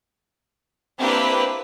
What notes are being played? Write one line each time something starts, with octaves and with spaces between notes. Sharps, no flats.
A#3 C4 D4 E4 G4 B4